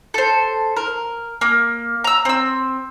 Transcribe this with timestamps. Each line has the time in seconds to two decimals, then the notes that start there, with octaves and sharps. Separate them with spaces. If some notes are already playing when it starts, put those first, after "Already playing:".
0.14 A4 C5
0.77 A#4
1.41 A#3
2.04 A#5 E6
2.25 C4 E6